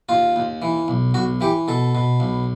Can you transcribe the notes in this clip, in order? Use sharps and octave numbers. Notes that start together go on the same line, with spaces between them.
D#2 F4
D#2
E3
B1
B1 F#4
E3 G4
B2 A4
B2
B1